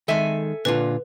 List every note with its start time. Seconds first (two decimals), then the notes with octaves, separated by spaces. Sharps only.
0.08 D#3 G#3 A4 E5 G#5
0.65 A#2 D3 F4 B4